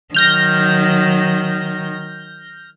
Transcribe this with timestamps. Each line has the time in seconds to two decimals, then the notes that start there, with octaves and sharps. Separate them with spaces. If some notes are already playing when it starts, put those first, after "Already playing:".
0.15 D#3 F#3 F6 G6 A#6